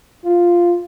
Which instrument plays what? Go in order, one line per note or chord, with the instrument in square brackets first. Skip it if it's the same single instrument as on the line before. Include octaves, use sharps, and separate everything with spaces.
[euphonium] F4